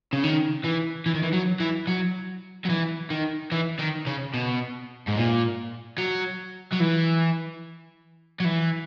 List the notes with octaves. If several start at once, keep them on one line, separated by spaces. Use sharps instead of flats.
C#3
D#3
E3
E3
D#3
E3
F#3
E3
F#3
F#3
E3
D#3
E3
D#3
C#3
B2
G#2
A#2
F#3
F#3
E3
F#3
E3